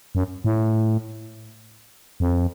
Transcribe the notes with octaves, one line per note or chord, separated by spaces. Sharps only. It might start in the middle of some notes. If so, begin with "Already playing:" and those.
F#2
A2
F2